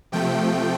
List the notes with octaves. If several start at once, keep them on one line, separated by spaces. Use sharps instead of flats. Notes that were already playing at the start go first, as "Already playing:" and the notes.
C3 F3 A3 G5